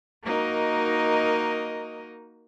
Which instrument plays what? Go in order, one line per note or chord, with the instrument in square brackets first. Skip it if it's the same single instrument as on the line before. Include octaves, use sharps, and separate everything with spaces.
[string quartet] A#3 D#4 F#4 A#4 D#5